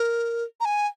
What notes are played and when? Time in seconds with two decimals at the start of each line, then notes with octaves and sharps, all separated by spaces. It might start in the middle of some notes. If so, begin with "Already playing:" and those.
Already playing: A#4
0.60 A#5
0.65 G#5